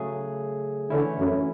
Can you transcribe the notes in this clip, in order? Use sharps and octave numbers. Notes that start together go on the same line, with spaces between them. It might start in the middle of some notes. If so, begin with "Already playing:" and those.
Already playing: C#3 F#3 A3 C#4 G#4
D3 E3 A3 C#4 E4
F#2